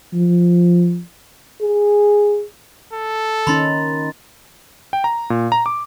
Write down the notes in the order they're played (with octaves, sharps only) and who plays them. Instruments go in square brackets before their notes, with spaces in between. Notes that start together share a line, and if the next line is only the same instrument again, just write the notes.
[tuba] F3
[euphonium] G#4
[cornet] A4
[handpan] D#3 C#4 D#4 [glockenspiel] B5 C6 A6
[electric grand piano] G5
A#5
A#2
A#5
D6